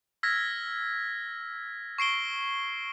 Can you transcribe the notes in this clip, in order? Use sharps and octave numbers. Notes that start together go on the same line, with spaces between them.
E6 F6 G#6 A#6 B6
C#6 C7 D7 G7